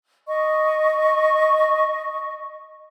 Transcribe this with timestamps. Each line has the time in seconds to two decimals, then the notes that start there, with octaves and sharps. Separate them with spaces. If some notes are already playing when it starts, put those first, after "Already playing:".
0.27 D#5 C#6